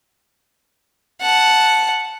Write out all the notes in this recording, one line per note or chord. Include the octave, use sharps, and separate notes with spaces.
F#5 A5